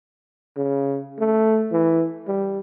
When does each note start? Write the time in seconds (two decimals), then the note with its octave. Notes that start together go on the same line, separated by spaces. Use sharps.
0.56 C#3
1.19 A3
1.72 E3
2.28 G3